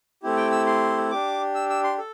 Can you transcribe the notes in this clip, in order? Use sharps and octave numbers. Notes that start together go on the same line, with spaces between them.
A3 C4 E4 G4
G5
E6
C6
D4 G4 D6
E6
E6
C6
A4